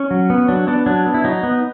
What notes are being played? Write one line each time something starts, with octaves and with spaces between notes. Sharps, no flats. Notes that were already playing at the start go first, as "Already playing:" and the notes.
Already playing: C#4
F#3
B3
F#3 D4
B3 D4
F#3 D4
B3
E4
F#3 D#4
B3